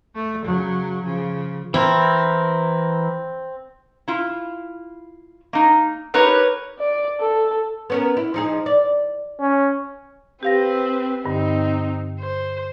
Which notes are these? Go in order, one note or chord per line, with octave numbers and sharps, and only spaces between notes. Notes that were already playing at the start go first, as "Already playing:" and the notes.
A3
C#3 F#3
C#3 F3
E3 C4 E4 A#4
E4 F4
A#3 D#4
D#4 G4 A#4 B4 C#5
D5
A4
B3 C#4 A#4
E4
F3 D#4 G#4
D5
C#4
C4 G4 B4 F5 A#6
G2 D3 C4 D#4
C5